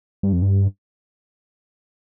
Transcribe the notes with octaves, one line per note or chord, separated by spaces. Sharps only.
G2
F2
G2